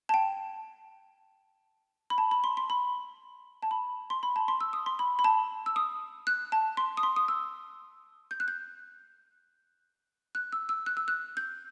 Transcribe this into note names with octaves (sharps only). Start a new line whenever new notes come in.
A5
G5
B5
A5
B5
C6
C6
B5
A5
B5
C6
B5
A5
C6
E6
D#6
C6
B5
B5
A5
E6
D#6
F#6
A5
C6
D#6
C6
D#6
E6
G6
F#6
G6
F#6
E6
E6
F#6
E6
F#6
G6